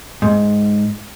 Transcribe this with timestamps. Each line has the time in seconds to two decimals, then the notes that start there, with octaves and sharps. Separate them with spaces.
0.22 G#2